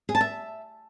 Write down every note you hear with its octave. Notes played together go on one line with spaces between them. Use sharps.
G#4
A5
E5